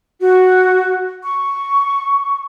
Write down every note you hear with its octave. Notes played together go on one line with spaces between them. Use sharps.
F#4
C#6